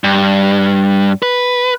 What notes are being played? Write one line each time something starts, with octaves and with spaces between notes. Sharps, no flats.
G2
B4